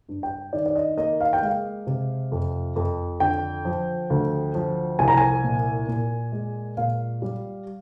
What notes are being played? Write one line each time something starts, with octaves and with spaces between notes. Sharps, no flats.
G2
G5
D#3 D5
D5
D#5
A#3 D#5
F5
G5
G#3 F5
C3
F2
F2
D3 G5
F3
D2
F3
C2 G#5
A#5
G#5
A#2
A#2
G#3
A#2 F5
G3